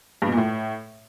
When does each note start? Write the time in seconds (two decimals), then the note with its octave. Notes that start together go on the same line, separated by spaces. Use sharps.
0.22 G2
0.27 B2
0.32 A#2
0.37 A2